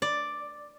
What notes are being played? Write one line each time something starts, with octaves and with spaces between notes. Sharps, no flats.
D5